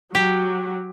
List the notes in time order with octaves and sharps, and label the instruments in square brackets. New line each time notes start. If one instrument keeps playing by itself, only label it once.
[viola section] F#3 [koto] G4